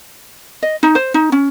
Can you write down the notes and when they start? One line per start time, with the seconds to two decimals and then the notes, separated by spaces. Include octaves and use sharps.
0.63 D#5
0.83 D#4
0.95 C5
1.14 D#4
1.32 C#4